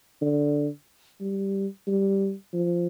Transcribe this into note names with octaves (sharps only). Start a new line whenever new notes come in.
D3
G3
G3
F3